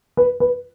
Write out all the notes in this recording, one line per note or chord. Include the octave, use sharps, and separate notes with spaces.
B4
B4